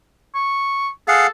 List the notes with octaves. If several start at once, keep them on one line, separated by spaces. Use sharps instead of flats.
C#6
G#4 A4 F5 F#5